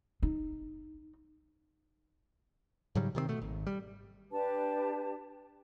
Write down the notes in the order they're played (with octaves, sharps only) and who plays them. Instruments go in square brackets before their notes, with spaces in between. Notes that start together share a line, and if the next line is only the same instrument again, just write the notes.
[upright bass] D#4
[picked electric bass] G#2 C#3 F#3 G3
C3 D#3 G#3 C4
B2 A3
G#1
G3
[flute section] D4 G4 B4 A5